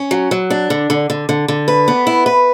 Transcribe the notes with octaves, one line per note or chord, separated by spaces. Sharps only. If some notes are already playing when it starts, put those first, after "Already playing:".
Already playing: C#4
F#3
F#3
D4
D3
D3
D3
D3
D3
B4
B3
E4
B4